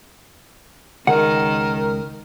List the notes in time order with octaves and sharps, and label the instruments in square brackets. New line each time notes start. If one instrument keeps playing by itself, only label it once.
[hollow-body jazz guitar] C#2 F#5 [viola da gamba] D#3 [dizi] A#4